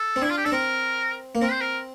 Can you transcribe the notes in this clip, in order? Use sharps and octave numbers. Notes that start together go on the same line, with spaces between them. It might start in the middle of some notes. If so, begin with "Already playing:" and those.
Already playing: A4
C4
D4 E4
F4
G4
D4 A4
C4 A#4
A#3
C4 A#4
C5
A#4